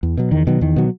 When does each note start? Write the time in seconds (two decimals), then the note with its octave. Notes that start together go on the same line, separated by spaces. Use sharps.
0.03 E2
0.17 B2 F#3
0.32 E2 D#3
0.47 B2 D#3 F#3
0.61 E2 D#3
0.76 B2 F#3